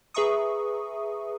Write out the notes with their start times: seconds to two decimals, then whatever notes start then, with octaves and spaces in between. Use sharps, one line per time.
0.14 G#4 B4 E5 A#5 C#6 D#6